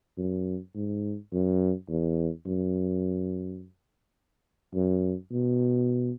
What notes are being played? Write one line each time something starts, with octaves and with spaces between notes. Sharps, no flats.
F#2
G#2
F#2
E2
F#2
F#2
B2